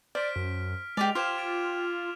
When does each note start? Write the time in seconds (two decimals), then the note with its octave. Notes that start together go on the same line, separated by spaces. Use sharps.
0.15 C5 D5 F6 B6 D7
0.36 F#2
0.97 G#3 G4 G#4 D5 F7
1.15 F4 G4 C5 F6 G#6 E7
1.38 D6 D7